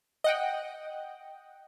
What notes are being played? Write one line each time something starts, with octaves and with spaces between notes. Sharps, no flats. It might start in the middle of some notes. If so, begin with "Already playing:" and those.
D#5 F#5 G5